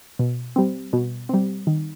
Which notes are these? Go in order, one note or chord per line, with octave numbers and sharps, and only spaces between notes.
B2
G3 C4
B2
G3 C4
D#3